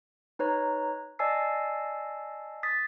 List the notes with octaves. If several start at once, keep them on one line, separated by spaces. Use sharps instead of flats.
D#4 B4 C#5 A#5
D5 D#5 G#5 A5 E6 C7
D#6 A6 B6